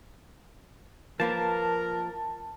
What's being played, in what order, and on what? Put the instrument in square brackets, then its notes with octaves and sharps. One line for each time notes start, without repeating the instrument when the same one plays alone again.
[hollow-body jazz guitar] F3 A#3 B4 [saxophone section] A#4 [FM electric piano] A5